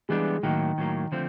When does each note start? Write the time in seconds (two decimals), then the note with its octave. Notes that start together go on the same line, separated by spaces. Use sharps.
0.09 E3 G3 G#3 B3 D4
0.43 A2 D#3 F#3 A#3
0.78 A2 F#3 A#3
1.12 D3 F3 A3 C4